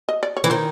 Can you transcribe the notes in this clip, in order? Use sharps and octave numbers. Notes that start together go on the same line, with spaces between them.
D#5
D5
C#5
E3
D#3 C5